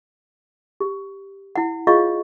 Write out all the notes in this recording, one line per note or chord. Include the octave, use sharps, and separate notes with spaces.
G4
E4 F#5
F4 G#4 C#5 D#5 F5 C#6